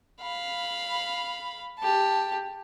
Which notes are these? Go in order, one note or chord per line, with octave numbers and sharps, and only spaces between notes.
F5 B5
G4 A5